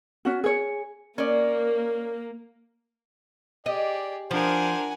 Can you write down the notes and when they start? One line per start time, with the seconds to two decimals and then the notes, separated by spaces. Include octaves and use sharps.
0.25 C#4 F#4
0.44 G#4 C#5
1.18 A#3 C#4 D5
3.66 G4 G#4 D5 D#5
4.31 F3 D4 A#4 C5 F#5 G#5